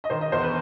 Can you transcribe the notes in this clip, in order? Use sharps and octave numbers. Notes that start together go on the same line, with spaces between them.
D#5
D#3 C5
D#5
E2 C5
B4